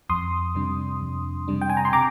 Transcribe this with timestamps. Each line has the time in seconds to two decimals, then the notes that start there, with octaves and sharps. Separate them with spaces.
0.09 F2 C6 D#6
0.55 C3 G3 D4
1.01 F2
1.48 C3 G3 D4
1.61 G5
1.70 G#5
1.77 A#5
1.85 C6
1.92 C3 A#5 D6